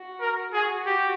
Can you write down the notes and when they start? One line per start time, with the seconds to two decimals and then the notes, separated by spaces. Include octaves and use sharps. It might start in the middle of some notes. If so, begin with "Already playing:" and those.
Already playing: F#4
0.21 A#4
0.53 F#4 G#4
0.86 G4